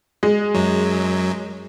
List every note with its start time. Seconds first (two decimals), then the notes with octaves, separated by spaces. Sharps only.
0.23 G#3
0.54 F#2 F#3